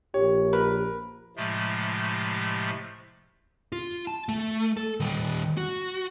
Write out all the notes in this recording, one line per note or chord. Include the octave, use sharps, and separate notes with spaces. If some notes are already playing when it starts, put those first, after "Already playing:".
A#1 G4 C#5
A#4 B4
A2 C3 F3 G#3 A3
F4
A5
A3
A4
D#3 G3
F#4